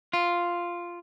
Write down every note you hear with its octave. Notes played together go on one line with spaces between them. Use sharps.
F4